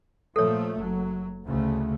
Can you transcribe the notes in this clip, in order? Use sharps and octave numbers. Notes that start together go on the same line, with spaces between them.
A#2 F3 A3 A4 C#5
F#1 F#3
D2 C#3 A3